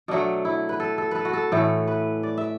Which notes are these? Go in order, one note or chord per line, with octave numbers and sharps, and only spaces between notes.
B2 F#3 A3 D4
E4
B4
A4
A4
A4 B4
F#4
A4
A2 E3 A3
B4
D5
E5